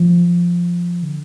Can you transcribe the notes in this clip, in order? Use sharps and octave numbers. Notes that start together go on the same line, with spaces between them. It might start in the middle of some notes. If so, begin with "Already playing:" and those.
Already playing: F3
D3